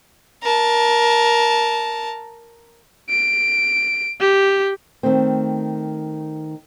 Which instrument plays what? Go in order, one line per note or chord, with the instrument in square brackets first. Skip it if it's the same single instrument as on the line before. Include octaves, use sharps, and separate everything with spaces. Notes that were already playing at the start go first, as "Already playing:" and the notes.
[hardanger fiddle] A#4 A5
[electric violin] D7
G4
[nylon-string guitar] D#3 A3 C4